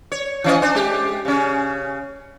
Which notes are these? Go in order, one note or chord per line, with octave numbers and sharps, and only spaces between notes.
C#5
E3 C#4 D#5
D4 C5
G#3 G4
C#3 C#4